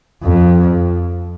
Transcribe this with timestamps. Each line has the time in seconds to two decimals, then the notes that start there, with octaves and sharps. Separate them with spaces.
0.23 F2